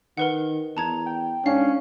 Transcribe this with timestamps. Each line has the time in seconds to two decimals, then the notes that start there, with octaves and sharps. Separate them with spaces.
0.17 D#3 A#4 B4 F#5
0.77 E2 A5 A#5 G#6
1.06 G5
1.46 G#2 C#4 D4 F5 C7